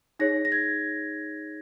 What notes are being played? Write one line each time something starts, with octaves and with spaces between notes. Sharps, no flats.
D#4 G#4 C#5 A#6
A#6
G#6